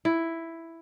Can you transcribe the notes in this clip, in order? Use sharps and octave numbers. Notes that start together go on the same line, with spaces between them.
E4